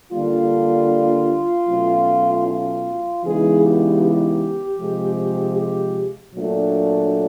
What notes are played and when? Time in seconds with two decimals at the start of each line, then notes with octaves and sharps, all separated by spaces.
0.12 D3 G3 A#3 D4 F4
1.68 B2 F#3 A3 C#4
2.46 F4
3.24 C#3 E3 G#3 B3 D#4 G#4
3.62 G4
4.01 G4
4.79 C3 F3 G#3
5.57 G4
6.34 A#2 F#3 A3 D4